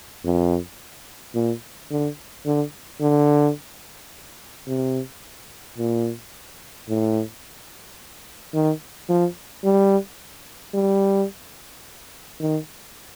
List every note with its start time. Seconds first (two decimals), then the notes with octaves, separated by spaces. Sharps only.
0.25 F2
1.34 A#2
1.91 D3
2.45 D3
3.01 D3
4.67 C3
5.78 A#2
6.88 A2
8.54 D#3
9.09 F3
9.64 G3
10.74 G3
12.40 D#3